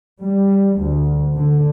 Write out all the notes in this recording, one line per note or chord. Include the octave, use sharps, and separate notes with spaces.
G3
D2
D3